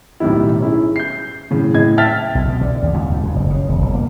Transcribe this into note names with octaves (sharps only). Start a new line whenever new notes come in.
B1 A2 D#3 G3 E4
C#4 E4 G#4
G6 C7
A2 C#3
A2 D#5 G#6
E5 G5 A5 F6 A6 B6
B1
B2
D3
D#2
C#2
E2
F2
F#1
C#3
E1
F#1
A#3